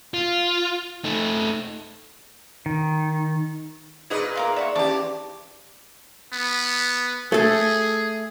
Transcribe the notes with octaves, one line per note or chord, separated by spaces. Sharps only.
F4
A3 D#4
D#3
A#2 D#4 G#4 B4 D#5
F4 G4 A#4 E5
D5 E5 F#5 C#6
E3 C#4 G4 A5 D6
B3
A3 G#4 A4